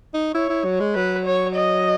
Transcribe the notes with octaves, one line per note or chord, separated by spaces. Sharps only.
D#4
E4 C#5
E4
F#3
G#3
F#3 B4
C#5
D#5